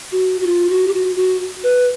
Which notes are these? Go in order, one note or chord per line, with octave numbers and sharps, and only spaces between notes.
F#4
F#4
F4
F#4
G4
F#4
F#4
B4